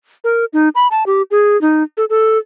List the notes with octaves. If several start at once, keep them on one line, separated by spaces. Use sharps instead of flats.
A#4
D#4
B5
A5
G4
G#4
D#4
A4
A4